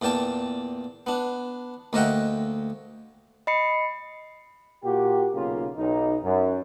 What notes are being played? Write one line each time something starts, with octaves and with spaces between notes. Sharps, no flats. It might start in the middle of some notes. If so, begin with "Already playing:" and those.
E2 A#2 D5 G5 A5
B3 D4
D2 A#3 D#5 E5 F#5 G5
D#5 B5 C7 C#7
A#2 F#4 G4
B1 C#3 A#3 F4
B1 D#4
F#2